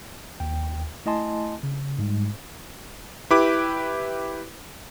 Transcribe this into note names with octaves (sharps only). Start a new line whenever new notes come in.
D#2 G5
A3 E4 D#5 G#5 A5 C6
C#3
G#2 G3 G#3
E4 G4 B4 D6